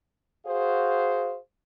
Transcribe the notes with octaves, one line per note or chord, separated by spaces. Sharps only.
F#4 G#4 C5 F5